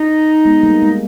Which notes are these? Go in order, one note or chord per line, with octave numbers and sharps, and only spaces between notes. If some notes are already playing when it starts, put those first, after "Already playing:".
Already playing: D#4
G#3 B3
G3 A#3
G#3